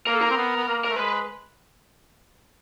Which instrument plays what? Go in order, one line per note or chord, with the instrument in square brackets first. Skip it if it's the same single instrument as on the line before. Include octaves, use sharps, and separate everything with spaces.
[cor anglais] A#3 [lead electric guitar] A#4
[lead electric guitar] A4
A#4
[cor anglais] C4
B3
B3
A#3
[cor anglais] A3 [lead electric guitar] A#4
[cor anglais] G#3 [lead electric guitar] B4